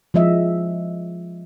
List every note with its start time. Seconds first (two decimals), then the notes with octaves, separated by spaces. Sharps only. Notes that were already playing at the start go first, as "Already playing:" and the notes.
0.14 F3 G#3 D#5 E5